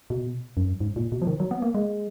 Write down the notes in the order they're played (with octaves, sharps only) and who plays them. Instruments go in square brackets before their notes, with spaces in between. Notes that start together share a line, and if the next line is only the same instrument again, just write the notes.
[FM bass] B2
F#2
G#2
A#2
B2
F3
D#3
F#3
B3
A#3
G#3